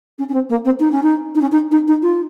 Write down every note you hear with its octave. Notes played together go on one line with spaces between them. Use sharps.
C#4
C#4
C4
A#3
C4
D#4
C#4
D#4
D#4
C#4
D#4
D#4
D#4
F4